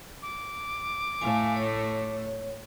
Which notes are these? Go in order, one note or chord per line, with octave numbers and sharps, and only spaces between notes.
D6
A2 A3 F5 G#5
C#5